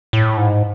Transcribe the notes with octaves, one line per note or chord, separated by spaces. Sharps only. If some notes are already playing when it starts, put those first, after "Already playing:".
A2
G#2